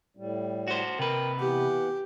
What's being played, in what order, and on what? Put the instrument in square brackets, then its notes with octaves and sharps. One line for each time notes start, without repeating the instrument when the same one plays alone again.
[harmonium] A2 G3
[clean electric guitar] F#4 C5
[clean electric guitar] C3 B4 [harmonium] A#4 G5
[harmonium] E3 B3 F#5 [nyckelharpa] G4